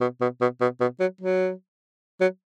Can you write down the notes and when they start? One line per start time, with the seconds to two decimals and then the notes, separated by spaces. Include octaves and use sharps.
0.01 B2
0.21 B2
0.41 B2
0.61 B2
0.80 B2
1.00 F#3
1.21 F#3
2.21 F#3